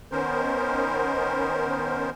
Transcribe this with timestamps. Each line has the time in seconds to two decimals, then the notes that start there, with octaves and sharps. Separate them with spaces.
0.12 D#3 B3 C#4 A#4 C5